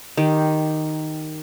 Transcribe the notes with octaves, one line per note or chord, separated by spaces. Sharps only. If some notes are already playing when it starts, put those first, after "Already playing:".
D#3 G4